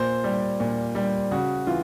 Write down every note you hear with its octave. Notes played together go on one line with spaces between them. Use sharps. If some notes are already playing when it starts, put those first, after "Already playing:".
Already playing: A#2 C5
G3
A#2
G3
C#3 F#4
E3 F4